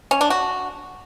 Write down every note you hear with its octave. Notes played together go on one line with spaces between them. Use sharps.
C#4
D4
F#4